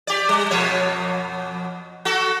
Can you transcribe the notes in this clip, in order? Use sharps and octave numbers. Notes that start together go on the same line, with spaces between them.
G4 D5
G3
F2 B2 C#5
F#4 A4